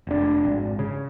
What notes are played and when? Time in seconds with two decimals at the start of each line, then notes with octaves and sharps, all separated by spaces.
0.07 F1 D4
0.45 G#1
0.79 C#3